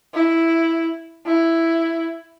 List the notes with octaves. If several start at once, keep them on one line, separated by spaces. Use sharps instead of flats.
E4
E4